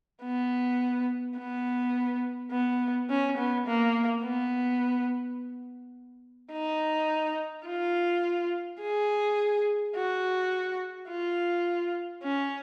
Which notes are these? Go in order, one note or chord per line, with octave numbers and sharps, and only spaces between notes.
B3
B3
B3
C#4
B3
A#3
B3
D#4
F4
G#4
F#4
F4
C#4